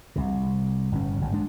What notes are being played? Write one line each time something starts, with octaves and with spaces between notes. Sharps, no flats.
C2 C3
G1 A2 C#3 C#4
G1 D2
G#3 D4